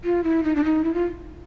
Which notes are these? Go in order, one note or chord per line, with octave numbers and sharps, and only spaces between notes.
F4
E4
D#4
D4
D#4
E4
F4